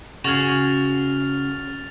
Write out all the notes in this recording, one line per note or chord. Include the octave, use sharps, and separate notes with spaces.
C#3 F#4 G#4 F6 A6 F7